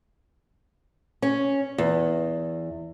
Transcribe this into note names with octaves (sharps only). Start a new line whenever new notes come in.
C#4
E2